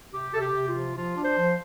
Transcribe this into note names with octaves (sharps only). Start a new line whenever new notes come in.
C3 G4
C3 A4
G4
C3
F4
F3
F3 F4
D4
C5
F3